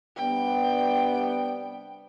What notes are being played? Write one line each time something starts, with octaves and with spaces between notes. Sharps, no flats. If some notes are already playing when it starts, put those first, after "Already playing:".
C3 G3 B3 D4 G5